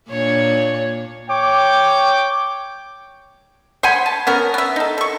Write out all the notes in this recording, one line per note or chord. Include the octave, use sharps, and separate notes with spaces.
A#2 D4 C#5
C#5 G5 D6
C5 F#5 G#5 B5
A5
B3 C#4 A#4
B3 E5
D#4 A4
A4 C#6